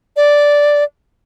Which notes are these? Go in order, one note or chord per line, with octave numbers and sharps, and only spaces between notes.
D5